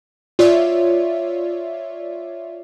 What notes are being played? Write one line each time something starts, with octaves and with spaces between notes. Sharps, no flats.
F4 C#5 D5 E5